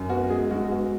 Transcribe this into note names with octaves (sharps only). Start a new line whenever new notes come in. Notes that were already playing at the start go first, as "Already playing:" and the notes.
Already playing: F#2
B3 F#4
G#3 G#4
G#3 F#4
B3 F#4